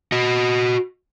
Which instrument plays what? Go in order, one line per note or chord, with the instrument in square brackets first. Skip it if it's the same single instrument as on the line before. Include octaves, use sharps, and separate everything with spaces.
[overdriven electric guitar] F#4 D#5